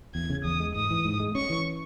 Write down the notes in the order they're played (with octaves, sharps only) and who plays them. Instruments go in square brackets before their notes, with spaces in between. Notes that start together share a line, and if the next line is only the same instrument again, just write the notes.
[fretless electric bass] E2 [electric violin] G#6
[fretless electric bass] C#3
[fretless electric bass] E2 [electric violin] D#6
[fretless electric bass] G#3
[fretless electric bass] G#2 [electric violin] D#6
[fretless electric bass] E3
G#2
G#3
[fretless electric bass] C#4 [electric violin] C#6
[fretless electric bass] E3